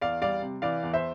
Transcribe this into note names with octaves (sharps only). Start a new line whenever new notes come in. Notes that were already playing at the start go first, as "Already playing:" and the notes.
E2 D5 F5
G3 D5 F5
C3
E3 D5 F5
E2
C5 E5